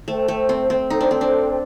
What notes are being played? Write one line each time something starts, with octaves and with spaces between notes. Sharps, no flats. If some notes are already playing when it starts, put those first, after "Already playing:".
A3 A4 C5 G5
A3
C4
C4
D#4 A4 C5 G5
D4
C4
D4